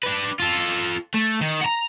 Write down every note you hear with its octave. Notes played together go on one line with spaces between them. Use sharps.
D4 B4
F4 A4
A3
D#3
F#5 A#5